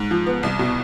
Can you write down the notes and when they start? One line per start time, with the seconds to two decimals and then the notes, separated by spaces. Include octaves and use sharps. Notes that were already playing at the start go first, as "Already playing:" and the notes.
Already playing: G#2
0.11 F3
0.26 B3
0.43 C2
0.59 B2